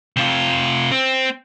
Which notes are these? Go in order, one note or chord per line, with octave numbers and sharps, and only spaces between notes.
C3 F4
C4